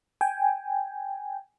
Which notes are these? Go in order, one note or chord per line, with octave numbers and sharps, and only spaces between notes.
G5 G#5